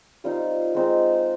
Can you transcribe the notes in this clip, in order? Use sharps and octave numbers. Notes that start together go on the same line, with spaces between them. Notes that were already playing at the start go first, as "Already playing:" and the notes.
G3 C4 D#4 F4 F5
G#3 C4 D#4